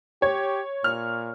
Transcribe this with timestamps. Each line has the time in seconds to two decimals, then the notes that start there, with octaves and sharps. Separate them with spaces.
0.22 G4 C#5
0.84 A#2 F6